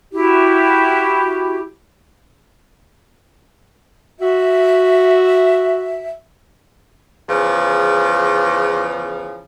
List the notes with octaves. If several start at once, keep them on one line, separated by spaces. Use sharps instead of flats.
E4 F#4 G4
F#4 E5
E2 C#3 F3